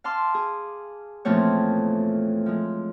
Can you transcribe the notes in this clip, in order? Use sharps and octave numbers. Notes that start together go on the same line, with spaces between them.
F5 A5 C6 D6 F6
G#4
E2 A#2 F3 A3 C4 C#5
F3 G#3